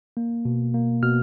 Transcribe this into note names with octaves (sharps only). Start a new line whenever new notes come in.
A#3
B2
A#3
B2 F6